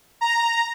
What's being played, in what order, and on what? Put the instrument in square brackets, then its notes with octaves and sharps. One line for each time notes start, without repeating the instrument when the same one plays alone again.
[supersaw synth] A#5